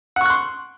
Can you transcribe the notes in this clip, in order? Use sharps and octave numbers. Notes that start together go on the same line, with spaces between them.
F#5 C6 C#6 F#6